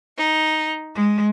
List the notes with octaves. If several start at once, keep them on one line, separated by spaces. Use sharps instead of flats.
D#4
G#3